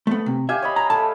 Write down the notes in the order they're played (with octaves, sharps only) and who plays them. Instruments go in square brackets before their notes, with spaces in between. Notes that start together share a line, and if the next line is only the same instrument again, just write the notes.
[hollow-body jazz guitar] A3 B3
C3
[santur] G4 F5 G#5 [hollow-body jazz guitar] E5
[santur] C#5 D#5 B5
[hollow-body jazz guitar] A#5
[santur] A3 [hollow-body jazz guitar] A5